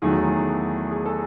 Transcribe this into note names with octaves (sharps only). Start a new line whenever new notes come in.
E2 D#3 F#3 A3 G#4
G#4
A4